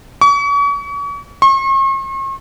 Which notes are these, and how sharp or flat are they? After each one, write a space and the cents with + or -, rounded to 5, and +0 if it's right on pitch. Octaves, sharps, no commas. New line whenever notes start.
C#6 +40
C#6 -45